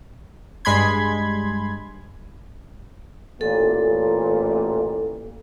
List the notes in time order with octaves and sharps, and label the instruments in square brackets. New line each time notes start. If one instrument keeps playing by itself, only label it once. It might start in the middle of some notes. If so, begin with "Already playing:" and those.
[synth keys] G2 G#3 B5 C6 G#6
[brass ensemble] A1 A#2 [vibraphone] A4